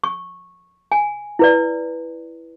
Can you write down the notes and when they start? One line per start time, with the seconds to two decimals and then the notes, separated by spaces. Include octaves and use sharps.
0.04 C#6
0.92 G#5
1.39 E4 B4 D5